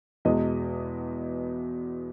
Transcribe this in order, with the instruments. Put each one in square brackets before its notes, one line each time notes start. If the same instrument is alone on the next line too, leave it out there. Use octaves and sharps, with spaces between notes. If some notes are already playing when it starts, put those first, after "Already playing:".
[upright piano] E2 B2 G#3 D#5